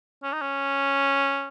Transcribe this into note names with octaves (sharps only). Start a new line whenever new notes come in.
C#4
D#4
C#4